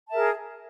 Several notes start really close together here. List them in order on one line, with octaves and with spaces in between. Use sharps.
A5 E5 A#4 G#4